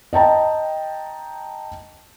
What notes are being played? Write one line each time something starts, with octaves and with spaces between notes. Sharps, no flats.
D#5 G5 A5 A#5